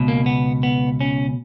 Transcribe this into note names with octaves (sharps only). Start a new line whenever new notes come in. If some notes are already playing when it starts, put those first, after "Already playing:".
Already playing: C#2 B2
A#3
B3
B3
C#4